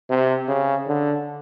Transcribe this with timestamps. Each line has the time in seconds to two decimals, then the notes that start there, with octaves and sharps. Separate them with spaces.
0.10 C3
0.48 C#3
0.87 D3